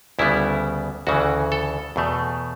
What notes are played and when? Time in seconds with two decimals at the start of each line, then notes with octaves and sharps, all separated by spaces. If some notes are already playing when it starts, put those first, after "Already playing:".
0.19 D2 C#3 G3 B3 E4
1.07 D2 C#3 E3 F#4
1.52 A4
1.96 E2 B2 A3